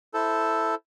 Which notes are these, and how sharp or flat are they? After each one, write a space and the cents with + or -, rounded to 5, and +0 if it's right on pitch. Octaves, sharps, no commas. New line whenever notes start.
E4 +0 A4 +0 C5 -10